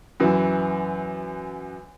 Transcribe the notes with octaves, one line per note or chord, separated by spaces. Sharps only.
F#2 E3